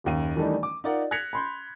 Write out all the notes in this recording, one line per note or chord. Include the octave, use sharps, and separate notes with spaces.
F#1 D#2 D#7
D#3 E3 G3 A3 D4 D#4
D6
D#4 F4 A#4 D5 D#5 F#5
F#6 G#6 A#6 B6 C#7 F7
B5 C6 G6